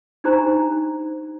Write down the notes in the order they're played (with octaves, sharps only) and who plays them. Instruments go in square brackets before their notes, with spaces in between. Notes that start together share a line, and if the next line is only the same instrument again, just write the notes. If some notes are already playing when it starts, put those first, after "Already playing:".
[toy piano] D4 D#4 G4 C5 A#5